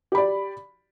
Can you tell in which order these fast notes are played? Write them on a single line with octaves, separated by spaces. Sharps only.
G4 B5 D5